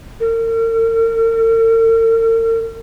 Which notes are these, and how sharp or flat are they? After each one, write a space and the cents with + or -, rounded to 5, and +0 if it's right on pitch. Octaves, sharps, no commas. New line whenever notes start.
A#4 -45